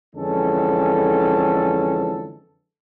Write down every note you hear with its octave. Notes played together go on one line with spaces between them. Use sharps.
F2 D3 E3 G#3 C#4 A4